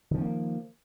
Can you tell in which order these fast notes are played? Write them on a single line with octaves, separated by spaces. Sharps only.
D#3 F3 C#4 A#3